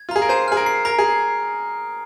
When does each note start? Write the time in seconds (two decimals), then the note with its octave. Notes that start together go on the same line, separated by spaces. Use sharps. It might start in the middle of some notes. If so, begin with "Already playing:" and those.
Already playing: G#6
0.09 F4
0.11 G#4 A#5
0.22 A#4
0.29 C5 G#5
0.48 G#4 F6
0.57 A#4
0.66 C7
0.85 A#4 A#5
0.98 G#4